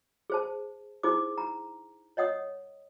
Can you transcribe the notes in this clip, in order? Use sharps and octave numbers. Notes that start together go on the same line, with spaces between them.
G#4 C5 A5
D#4 E4 G#4 C5 D6
A#5
C#5 D#5 F#5 D#6